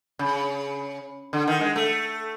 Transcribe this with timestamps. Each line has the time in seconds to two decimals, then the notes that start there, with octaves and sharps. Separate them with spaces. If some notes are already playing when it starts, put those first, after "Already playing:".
0.19 C#3
1.33 D3
1.48 D#3
1.61 G#3
1.76 A3